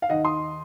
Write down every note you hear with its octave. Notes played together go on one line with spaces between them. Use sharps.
F5
D#2 D#3 D#5 F#5
C6 D#6